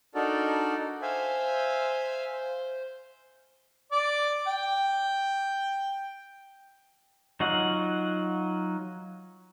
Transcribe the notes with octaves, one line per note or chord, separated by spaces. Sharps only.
D4 D#4 F#4 A4 A#4 D5
C5 E5 F5 G#5
C5
D5
G5
F#3 D#4 F4 F#5